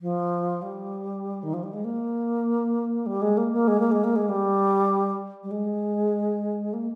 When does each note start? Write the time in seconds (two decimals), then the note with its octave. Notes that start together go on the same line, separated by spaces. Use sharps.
0.01 F3
0.62 G3
1.43 D#3
1.53 F3
1.63 G3
1.73 G#3
1.84 A#3
3.06 G3
3.21 G#3
3.37 A#3
3.52 A#3
3.67 G#3
3.79 A#3
3.91 G#3
4.04 A#3
4.15 G#3
4.29 G3
5.43 G3
5.51 G#3
6.73 A#3